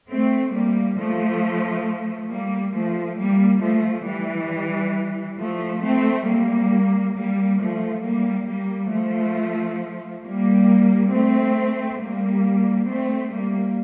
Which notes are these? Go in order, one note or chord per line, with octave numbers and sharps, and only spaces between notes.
A3 C4
G3 A#3
F3 A3
G3 A#3
F3 A3
G3 A#3
F3 A3
E3 G3
F3 A3
A3 C4
G3 A#3
G3 A#3
F3 A3
G3 A#3
G3 A#3
F3 A3
G3 A#3
A3 C4
G3 A#3
A3 C4
G3 A#3